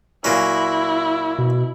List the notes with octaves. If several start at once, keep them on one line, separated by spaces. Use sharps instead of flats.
A#2 F#3 C#4 E4
B2